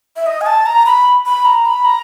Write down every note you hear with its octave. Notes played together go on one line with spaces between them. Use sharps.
E5
D#5
G#5
A5
A#5
B5
B5
A#5
B5
A#5